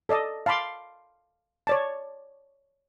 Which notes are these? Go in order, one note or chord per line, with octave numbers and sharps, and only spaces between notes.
A4 D5 D#5 A5
F5 A5 B5 C6 D6
C#5 D5 A5